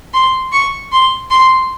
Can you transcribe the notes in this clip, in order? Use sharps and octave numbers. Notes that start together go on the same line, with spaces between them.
C6
C#6
C6
C6